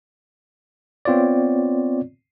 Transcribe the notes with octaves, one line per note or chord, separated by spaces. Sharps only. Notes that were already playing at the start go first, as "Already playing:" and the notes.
B3 C4 F4 C#5 D5